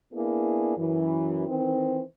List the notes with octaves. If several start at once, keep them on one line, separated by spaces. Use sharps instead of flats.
A#3 B3 D4 E4 G#4
F#2 E3
D#3 E3 C4